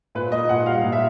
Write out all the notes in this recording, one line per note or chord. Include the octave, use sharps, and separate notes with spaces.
A#2 B4
A#3 D#5
A#2 F#5
G3 F5
A#2
E5